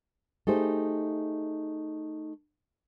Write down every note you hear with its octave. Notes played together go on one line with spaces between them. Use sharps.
A3 D#4 G4 G#4 C5